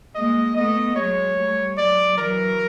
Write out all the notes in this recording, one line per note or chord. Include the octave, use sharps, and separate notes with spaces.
G#3 A#3 D#5
A3 B3 D#5
F#3 G#3 C#5
G3 A3
F#3 G#3 D5
E3 F#3 A#4